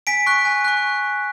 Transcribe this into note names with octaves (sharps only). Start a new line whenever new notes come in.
G#5 B6 D7
C#6 F#6
G#5
C#6 F#6